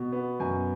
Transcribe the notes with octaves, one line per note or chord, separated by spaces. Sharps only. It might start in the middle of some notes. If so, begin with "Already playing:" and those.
Already playing: B2
B3
F#2 G#5